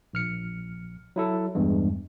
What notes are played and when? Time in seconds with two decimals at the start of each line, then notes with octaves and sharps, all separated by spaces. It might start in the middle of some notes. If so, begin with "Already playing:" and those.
0.13 A#1 F6 C#7
1.16 F#3 E4 A4
1.55 E2 G2 G#3